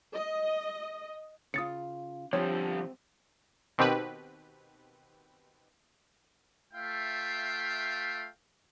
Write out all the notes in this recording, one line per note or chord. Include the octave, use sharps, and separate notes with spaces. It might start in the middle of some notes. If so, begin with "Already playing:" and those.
D#5
C#3 F4 D#6 A6 C#7
D3 F3 G3 C4 C#5
B2 D#3 C4 G4 B4
A3 F4 E5 F5 G5